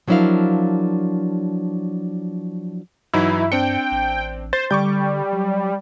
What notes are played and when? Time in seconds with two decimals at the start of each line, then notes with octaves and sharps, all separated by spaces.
0.08 F3 F#3 D4 E4 A#4 F5
3.14 G2 E3 F#3 D#4 E4
3.52 C4 D4 G5 C#7
3.92 A1
4.53 C5 A6
4.71 D3 G3 C#6 D6 G6
5.33 F#3